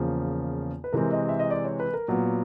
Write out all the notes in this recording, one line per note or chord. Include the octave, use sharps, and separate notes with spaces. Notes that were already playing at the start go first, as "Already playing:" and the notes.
Already playing: E2 C#3 F3 A#3
B4
C3 E3 G#3 C4 A#4
D#5
E5
D#5
D5
C#5
B4
A#4
A#2 F#3 B3